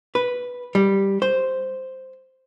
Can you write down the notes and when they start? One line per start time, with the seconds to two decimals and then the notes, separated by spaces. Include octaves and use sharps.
0.15 B4
0.75 G3
1.22 C5